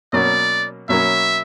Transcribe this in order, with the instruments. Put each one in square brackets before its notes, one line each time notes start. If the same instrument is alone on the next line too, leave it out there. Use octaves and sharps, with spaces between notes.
[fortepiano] B2 F#3 A#3 C#4 [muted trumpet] D5
[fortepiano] B2 F#3 A#3 C#4 [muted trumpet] E5